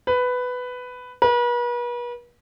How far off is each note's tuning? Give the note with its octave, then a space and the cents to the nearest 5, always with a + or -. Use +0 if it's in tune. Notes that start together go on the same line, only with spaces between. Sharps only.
B4 +10
B4 -40